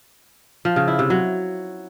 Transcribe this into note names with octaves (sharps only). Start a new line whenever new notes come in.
F3
C#3
E4
C3
F#3